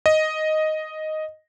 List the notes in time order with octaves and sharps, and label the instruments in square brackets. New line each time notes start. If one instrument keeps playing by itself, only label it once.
[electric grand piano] D#5